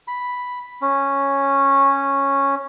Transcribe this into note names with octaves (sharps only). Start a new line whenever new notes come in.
B5
C#4